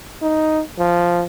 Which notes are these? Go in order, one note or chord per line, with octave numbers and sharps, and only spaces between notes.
D#4
F3